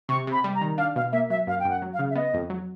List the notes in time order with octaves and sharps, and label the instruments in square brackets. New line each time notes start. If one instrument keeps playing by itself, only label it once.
[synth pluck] C3 [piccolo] C#6
[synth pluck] C3 [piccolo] B5
[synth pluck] G3
[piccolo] A#5
[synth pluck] D#3
[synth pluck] D4 [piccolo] F5
[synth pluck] B2 [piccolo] F5
[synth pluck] A#3 [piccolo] E5
[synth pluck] F#3 [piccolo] E5
[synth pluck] F#2 [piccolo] F5
[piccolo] G5
[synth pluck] F#2 [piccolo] F#5
[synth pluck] F#3
[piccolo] F5
[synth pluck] C#3
[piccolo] E5
[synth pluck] B3 [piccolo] D#5
[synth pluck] F2
F#3